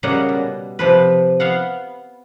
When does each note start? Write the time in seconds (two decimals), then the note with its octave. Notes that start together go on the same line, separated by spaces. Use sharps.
0.03 A#2 C#3 G3 A#3 D#5 F#5
0.29 B2
0.79 C3 F3 B4
1.40 B3 F5 F#5